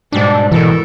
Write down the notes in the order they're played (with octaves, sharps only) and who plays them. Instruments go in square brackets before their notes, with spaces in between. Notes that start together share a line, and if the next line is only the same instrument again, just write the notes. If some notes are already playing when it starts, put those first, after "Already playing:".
[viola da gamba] G#2 B2 G3 [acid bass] D4
[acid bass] B2 [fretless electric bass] E3 [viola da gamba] A4 A#4